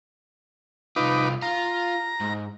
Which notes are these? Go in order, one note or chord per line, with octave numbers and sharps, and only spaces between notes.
C2 D#4 F4 B4 D6
F4 A#5
G#2